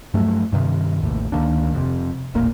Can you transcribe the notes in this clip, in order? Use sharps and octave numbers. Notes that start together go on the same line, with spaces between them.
G2 F3 F#3 A3
G2 C3 D#3
A1 D#2 A2
D2 D#3 A#3 D4
F1 F2 C3
E1 A1 A#2 A#3